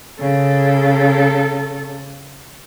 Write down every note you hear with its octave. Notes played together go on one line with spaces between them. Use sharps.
C#3 A4